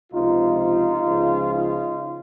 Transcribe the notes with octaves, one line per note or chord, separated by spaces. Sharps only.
C#2 C3 F3 D#4 F4
C#2 C#3 F3
D#4 F4